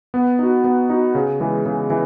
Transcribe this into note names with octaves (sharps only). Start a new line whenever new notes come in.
B3
D#4 F#4
B3
D#4 F#4
C#3
E3 G#3
C#3
E3